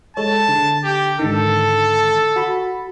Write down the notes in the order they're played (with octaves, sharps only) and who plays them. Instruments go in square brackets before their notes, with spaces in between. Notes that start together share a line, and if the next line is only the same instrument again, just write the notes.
[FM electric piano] G#3 A4 C#5 [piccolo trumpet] A5
[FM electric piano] D3
[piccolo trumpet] G4
[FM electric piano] G#2 D3 D#3 [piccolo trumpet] A4
[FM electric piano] F#4 B5